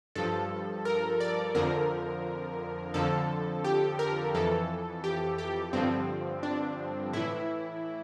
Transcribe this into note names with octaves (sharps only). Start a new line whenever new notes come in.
G2 F3 A4
A#4
D5
F2 D3 F3 A#4
F2 D3 F3 A4
G4
A#4
F2 E3 A4
G4
G4
G2 D3 F3 C4
D4
A2 E3 E4